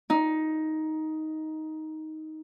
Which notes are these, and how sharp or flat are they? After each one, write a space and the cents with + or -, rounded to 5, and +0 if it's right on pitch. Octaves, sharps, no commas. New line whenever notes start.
D#4 +10